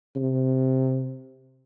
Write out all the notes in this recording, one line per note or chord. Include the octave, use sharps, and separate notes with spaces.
C3